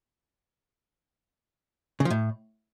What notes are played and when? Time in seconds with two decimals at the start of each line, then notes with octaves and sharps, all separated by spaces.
2.00 C#3
2.05 F3
2.10 A2